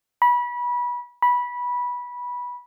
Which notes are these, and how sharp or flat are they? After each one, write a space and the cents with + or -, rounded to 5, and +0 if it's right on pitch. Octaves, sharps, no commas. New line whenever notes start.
B5 -25
B5 -15